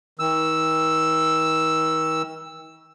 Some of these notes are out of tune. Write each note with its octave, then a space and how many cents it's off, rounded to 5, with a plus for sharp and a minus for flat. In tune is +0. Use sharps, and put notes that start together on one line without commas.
D#3 +40 E6 +0